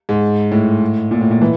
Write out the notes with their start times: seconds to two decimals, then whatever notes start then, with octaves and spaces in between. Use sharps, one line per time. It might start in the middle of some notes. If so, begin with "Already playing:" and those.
0.09 G#2
0.51 A2
1.11 A#2
1.21 A2
1.31 A#2
1.41 E3